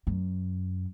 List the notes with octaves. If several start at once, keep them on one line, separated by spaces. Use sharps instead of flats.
F#2